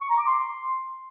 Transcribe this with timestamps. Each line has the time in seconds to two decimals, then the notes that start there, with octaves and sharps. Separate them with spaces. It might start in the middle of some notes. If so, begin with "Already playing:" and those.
0.01 C#6
0.10 A#5
0.18 D6
0.27 C6